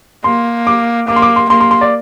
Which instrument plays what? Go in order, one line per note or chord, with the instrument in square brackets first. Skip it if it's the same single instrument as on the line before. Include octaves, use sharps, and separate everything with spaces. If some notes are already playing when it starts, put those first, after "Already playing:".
[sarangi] A#3 [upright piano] C6
[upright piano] D6
[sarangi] A#3 [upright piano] D6
[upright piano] C6
D6
C6
[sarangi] A#3 [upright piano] C6
[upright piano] C6
C6
D5